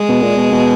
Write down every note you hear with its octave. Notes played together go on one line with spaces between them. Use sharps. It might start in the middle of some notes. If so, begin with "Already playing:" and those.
Already playing: G#3
B2
A#2
B2
B2